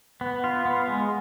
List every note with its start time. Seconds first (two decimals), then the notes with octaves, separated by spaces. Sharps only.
0.21 B3
0.44 F4
0.65 B3
0.88 G#3